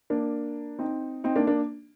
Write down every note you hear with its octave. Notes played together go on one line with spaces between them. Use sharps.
A#3 D4
C4 D#4
C4 D#4
A#3 D4
A#3 D4